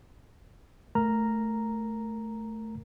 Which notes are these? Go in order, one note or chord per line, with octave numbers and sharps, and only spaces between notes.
A3 A#4 A#5